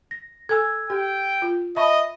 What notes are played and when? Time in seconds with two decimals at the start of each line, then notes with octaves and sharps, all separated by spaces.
0.11 A#6
0.49 A4 G#5 E6 G#6
0.90 G4 G5
1.42 F4
1.76 D#5 E5 A5 B5 C#6